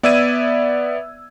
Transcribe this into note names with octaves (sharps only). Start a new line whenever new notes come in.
B3 D5 E5 E6 G#6 D#7